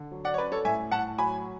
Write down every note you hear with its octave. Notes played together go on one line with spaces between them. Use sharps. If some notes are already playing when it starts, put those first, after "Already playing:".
Already playing: D3
F#3
D5 F#5
C#5
C#4 B4 D5
A4 C#5
A2 E5 G#5
A2 F#5 A5
F#3 G#5 B5